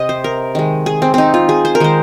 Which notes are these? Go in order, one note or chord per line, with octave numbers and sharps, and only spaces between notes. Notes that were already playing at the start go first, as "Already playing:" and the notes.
Already playing: C3 D#5
C5
A#4
D#3 G#3
G#4
C4
C4 D#4
F4
G#4
C5
A#4
D#3 G#3 C5